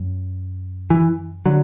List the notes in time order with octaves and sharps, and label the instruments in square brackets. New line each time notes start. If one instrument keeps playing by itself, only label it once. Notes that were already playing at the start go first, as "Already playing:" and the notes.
Already playing: [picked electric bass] F#2
E3
D3 F#3